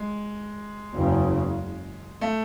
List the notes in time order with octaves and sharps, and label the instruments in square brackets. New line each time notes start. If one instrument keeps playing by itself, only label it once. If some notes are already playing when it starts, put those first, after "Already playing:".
Already playing: [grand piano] G#3
[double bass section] F#1 E2 C#3
[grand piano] A3